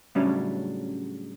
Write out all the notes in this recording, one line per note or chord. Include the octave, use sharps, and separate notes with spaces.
A2 C#3 F#3 G3 C#4 D4